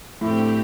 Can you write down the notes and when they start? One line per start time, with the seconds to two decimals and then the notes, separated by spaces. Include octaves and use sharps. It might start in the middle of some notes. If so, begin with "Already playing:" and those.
0.21 F2 A2 D3 A3 C4 G4